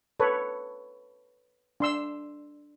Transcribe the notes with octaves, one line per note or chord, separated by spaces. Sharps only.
A4 B4 C#5
D4 C6 E6